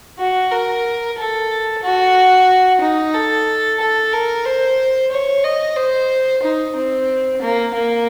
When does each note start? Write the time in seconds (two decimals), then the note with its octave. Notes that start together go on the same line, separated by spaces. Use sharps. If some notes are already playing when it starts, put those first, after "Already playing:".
0.19 F#4
0.51 A#4
1.18 A4
1.83 F#4
2.81 D#4
3.14 A4
3.80 A4
4.13 A#4
4.46 C5
5.11 C#5
5.44 D#5
5.76 C5
6.43 D#4
6.76 C4
7.42 A#3
7.74 A#3